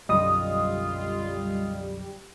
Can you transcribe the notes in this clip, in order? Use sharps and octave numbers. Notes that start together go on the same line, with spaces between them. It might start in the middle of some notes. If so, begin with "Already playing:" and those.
B1 F#2 D3 G3 F4 D#5 D#6